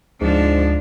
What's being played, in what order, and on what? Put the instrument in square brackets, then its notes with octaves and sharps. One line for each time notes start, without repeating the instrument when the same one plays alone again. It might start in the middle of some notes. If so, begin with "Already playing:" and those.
[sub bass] D2 [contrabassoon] G#2 [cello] F3 D4